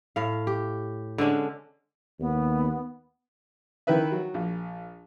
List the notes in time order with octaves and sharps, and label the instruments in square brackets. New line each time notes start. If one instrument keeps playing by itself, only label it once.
[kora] A2 F5
G4
D3 G#3 C#4 D4
[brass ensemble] D#2 [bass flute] B3
[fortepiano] D#3 E4 B4 E5
F#3
A#1